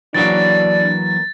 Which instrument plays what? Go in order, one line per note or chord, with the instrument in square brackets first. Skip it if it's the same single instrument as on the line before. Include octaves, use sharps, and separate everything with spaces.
[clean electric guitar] E3 F#3 A#3 [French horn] D4 [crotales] A6